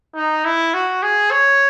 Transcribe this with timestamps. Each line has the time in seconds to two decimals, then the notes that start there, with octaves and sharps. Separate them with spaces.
0.16 D#4
0.45 E4
0.74 F#4
1.03 G#4
1.31 C#5